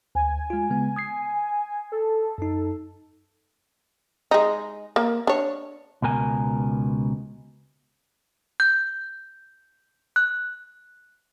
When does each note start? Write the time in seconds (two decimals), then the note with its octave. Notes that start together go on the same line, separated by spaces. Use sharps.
0.15 D2 G#5
0.50 G#3 F4
0.70 C#3 G#3 B3
0.96 D#6 G#6 C7
1.92 A4
2.38 F#2 D#4
4.31 G#3 D#4
4.96 A#3
5.27 D4 C#5
6.02 C#2 B2 A#4 G#5
8.60 G6
10.16 F#6